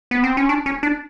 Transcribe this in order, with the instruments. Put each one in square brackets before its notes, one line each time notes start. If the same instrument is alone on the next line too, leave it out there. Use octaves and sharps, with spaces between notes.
[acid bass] B3
C4
C#4
D4
C#4
D4